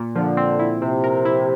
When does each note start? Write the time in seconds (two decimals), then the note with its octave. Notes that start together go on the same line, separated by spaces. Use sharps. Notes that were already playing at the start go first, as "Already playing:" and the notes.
Already playing: A#2
0.16 D3 F3
0.37 C4
0.59 E4
0.82 C3 C4
1.04 A#4
1.25 E4